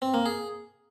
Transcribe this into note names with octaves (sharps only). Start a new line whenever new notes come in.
C4
A#3
G#4